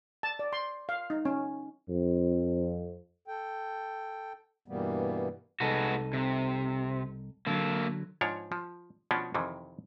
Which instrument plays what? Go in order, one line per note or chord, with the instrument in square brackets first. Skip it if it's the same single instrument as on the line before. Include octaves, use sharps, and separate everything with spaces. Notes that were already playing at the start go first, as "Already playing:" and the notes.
[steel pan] A5
D5
C6
F5
D#4
C#4
[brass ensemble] F2
[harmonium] A4 G5
G2 B2 E3 G3 A#3 B3
[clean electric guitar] C2 D#4 A4 [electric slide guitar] G#3 B3 F#4
[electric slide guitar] C3
[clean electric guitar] D3 F#3 [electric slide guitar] A#3 A4
[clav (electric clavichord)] G#2 F3 D4 C#5
F3
B2 F3 B3 C#4 D4
F2 C3 D#3 E3